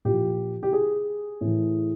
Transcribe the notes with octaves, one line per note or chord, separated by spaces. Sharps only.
A#2 F3 G4
G4
G#4
A2 E3